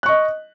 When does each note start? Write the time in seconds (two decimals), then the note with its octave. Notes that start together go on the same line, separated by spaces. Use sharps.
0.03 F#6
0.06 C#6
0.09 D#5